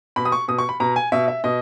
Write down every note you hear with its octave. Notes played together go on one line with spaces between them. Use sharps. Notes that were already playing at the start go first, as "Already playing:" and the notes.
B2 B5
D#6
C#6
B2 D#6
C#6
B5
B2 A#5
G#5
B2 E5
E5
B2 D#5